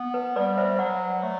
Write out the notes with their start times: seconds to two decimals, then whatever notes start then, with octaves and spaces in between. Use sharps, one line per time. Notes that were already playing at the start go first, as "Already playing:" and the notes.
Already playing: B3
0.14 B4
0.36 G3 B4 D5
0.58 C5 E5
0.79 F#3 D5 F#5
1.23 A3